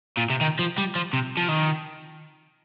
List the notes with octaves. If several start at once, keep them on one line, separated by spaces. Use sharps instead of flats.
A#2
C3
D#3
F3
G3
F3
C3
F3
D#3